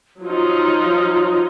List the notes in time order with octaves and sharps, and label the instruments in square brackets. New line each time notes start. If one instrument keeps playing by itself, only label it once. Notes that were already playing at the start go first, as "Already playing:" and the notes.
[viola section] F3 F#3 D#4 [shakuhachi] F4